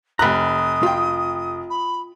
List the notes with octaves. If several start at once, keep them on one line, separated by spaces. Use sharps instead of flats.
F1 A#5 B5 D#6 F#6
F4 G5
B5